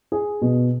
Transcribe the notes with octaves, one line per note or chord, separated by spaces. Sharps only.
G#4
B2